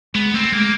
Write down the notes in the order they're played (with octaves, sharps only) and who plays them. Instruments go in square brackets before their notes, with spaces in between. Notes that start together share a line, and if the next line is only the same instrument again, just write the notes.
[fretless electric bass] G#3 [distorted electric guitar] B3
[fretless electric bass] A3 [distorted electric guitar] C4
[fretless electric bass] G#3 [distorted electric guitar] A#3